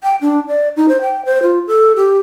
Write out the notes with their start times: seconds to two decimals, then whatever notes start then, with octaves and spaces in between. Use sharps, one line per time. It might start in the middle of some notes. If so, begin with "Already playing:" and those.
0.03 G5
0.21 D4
0.48 D5
0.77 D#4
0.89 C5
1.02 G5
1.25 C5
1.43 F4
1.67 A4
1.96 G4